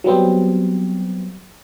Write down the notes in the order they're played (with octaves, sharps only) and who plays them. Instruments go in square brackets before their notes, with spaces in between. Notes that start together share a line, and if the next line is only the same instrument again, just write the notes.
[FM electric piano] F#3 G3 B3 C4